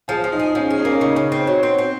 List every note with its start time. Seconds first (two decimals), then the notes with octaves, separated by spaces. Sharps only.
0.08 F3 G#4
0.24 F3
0.32 D#4
0.40 G#4
0.55 F3 C#4
0.70 G#4
0.78 C#4
0.85 A#3
0.91 C#4
1.01 C#3 D#4
1.16 C#3
1.32 C4
1.47 F#3
1.63 C4
1.78 C4